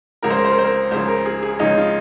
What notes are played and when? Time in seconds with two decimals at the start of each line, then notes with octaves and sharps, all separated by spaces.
0.23 C#2 C#3 F3 A#4
0.30 C5
0.36 A#4
0.45 C5
0.52 A#4
0.59 C5
0.65 A#4
0.91 C#2 C#3 F3 C5
1.08 A#4
1.26 G#4
1.42 G#4
1.59 C#2 C#3 F3 D#4
1.77 F4